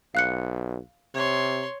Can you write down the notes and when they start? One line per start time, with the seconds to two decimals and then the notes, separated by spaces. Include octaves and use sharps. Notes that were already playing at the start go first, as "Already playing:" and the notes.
0.15 B1 F5 F#6 C#7
1.14 C3 C#5 C6